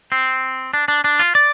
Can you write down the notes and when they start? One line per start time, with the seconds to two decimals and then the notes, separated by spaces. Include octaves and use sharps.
0.12 C4
0.74 D4
0.88 D4
1.04 D4
1.19 F4
1.35 D5